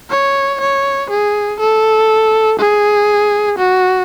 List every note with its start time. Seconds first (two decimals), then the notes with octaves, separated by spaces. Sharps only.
0.10 C#5
0.61 C#5
1.10 G#4
1.60 A4
2.59 G#4
3.58 F#4